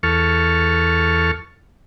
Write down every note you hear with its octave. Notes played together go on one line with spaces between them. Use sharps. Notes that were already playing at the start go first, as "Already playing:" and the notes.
E2 A4 C#6 F6